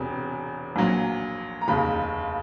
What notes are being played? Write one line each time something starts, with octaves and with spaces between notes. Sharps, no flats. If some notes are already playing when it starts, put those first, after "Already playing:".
Already playing: E1 E2 C3
A#1 A#2 F#3
A#5
F1 D#2 C#3 B5